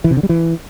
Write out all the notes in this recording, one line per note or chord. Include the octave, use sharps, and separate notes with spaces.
E3
C3
D3
G3
E3